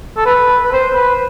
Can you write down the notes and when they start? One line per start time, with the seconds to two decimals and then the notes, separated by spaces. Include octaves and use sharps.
0.17 A4
0.26 B4
0.64 B4
0.73 C5
0.95 B4